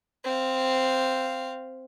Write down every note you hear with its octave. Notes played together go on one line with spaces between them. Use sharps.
C4 F5